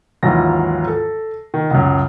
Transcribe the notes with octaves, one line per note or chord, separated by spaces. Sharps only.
D#2 G#2 E3 F#3 F4 A#6
A4
D#3
C#2 F#2